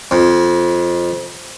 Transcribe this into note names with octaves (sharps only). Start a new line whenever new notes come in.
F2